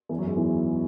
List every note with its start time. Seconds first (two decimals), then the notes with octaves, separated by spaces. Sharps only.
0.09 E2 E3
0.19 F#2 F#3
0.27 G#2 G#3
0.37 E2 E3